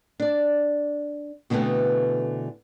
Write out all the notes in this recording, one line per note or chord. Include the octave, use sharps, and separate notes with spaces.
D4 D5
B2 D3 E3 A3 B3 C4